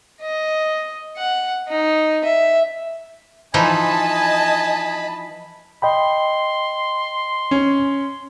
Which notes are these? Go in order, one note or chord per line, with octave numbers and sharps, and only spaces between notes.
D#5
F#5
D#4
E5
E3 F3 D#4 D#5 G#5 A5 B5
D#5 G5 B5 C6
C#4